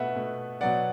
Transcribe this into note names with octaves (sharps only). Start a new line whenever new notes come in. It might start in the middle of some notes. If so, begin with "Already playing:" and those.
Already playing: B2 A3 B4 E5 F#5
B2 A3
B2 F#3 B3 D5 F#5